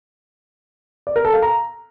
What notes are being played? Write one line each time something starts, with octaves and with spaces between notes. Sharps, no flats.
D5
A#4
A4
F5
A#5